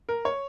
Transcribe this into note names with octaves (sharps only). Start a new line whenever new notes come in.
A#4
C#5